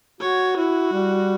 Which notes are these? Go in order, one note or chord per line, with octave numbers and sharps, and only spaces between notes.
F#4 C#5
E4 F#4
G3